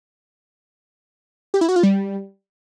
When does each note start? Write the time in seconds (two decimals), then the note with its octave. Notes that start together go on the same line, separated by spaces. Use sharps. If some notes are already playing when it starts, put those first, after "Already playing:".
1.54 G4
1.61 E4
1.69 F#4
1.76 F4
1.83 G3